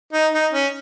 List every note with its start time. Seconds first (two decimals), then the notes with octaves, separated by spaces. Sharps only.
0.13 D#4
0.33 D#4
0.53 C#4